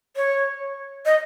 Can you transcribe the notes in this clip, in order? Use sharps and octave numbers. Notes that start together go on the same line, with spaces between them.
C#5
D#5